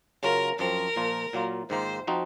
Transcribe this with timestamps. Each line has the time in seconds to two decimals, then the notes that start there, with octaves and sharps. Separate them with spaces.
0.23 C#3 F#3 C#4 F4 A#4
0.59 F#2 F3 C4 A#4
0.96 A#2 F3 A#3 F4
1.33 A#2 F#3 A#3 F4
1.70 G#2 D#3 A#3 F4 C5
2.07 F3 C4 D#4 F#4